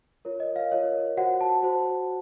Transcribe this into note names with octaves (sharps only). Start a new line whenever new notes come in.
F4 A#4 C#5
D#5
F5
F4 A#4 C#5 D#5
F#4 C5 F#5
A5
F#4 C5